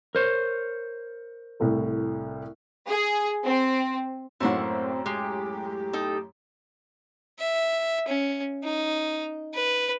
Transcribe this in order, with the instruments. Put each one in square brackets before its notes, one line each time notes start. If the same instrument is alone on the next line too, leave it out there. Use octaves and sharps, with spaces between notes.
[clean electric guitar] A#4 C5 C#5
[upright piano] C2 A2 A3
[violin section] G#4
C4
[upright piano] F#2 A2 [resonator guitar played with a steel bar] A3 A#3 F#5 [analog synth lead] C4
[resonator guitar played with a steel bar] G#3 [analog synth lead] G4
[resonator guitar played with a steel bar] D#4 A4
[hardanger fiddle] E5
C#4
D#4
B4